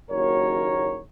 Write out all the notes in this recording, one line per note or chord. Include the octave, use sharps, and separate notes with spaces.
F#1 D#2 F#4 A#4 C#5